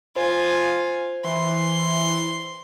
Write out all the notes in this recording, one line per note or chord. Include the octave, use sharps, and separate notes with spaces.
F4 C5 G#5
E3 C6